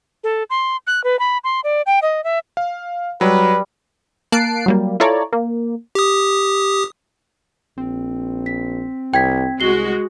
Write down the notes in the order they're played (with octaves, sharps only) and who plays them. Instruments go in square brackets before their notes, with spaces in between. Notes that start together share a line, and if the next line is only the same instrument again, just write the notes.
[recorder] A4
C6
F#6
B4
B5
C6
D5
G5
D#5
E5
[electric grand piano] F5
[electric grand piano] F#3 [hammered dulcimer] G3 [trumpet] B4
[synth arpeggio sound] A#3 A5 F#6 C7 D7
F#3 G3 A#3
E4 F4 A4 C#5 D5 A#5
A#3
[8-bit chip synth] G4 D#6
[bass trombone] A#1 [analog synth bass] C4
[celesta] B6
[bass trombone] C2 [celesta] G5 G#6 B6
[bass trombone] C2 [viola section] G#3 F#4 [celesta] C7 G7